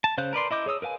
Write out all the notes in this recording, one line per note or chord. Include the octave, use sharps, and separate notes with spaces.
A5
C#3 C5 F5 F#6 G6
A#4 B4 D5 C6
E4 D#5 D6 G6
G#4 C#5 D#6 E6
A#4 B4 F5 G#5